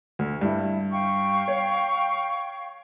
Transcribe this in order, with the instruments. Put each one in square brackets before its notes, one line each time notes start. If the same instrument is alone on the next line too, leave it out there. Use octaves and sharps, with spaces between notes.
[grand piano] D2
[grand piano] G2 [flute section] E4
[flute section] F5 G5 C#6
[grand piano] C#5